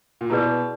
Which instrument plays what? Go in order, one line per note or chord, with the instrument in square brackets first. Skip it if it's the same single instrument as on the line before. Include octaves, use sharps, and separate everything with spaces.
[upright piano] A#2
[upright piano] B2 [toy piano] E4 G#4 B4 D5